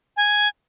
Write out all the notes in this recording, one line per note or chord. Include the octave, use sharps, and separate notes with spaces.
G#5